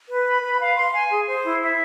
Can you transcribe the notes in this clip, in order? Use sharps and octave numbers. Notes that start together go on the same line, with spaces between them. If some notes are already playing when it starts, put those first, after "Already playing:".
B4
B5
B4
F5
C6
G#5
G#4
C5
E4
E5